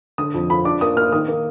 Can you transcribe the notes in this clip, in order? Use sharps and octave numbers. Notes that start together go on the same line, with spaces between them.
D3 D#6
F2
F3 B5
D4 D6
A#3 D#6
A#3 F6
D#3 D#6
A#3